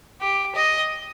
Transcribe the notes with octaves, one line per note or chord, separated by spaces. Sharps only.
G4
D#5